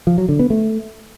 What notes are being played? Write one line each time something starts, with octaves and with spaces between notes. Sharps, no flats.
F3
F#3
D3
B3
A3